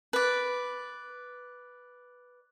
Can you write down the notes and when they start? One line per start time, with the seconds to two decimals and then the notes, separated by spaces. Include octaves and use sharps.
0.13 B4 D5